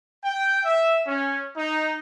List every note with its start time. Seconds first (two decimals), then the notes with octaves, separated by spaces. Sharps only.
0.24 G5
0.64 E5
1.07 C#4
1.57 D#4